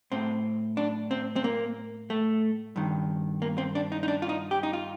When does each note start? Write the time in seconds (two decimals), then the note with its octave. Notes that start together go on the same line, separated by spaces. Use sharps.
0.12 A2 C4
0.77 D4
1.11 C4
1.36 C4
1.44 A#3
2.10 A3
2.76 G2 D#3
3.42 A#3
3.58 C4
3.75 D4
3.92 D#4
4.03 D#4
4.08 D4
4.22 F4
4.29 D#4
4.51 G4
4.63 D#4
4.73 F4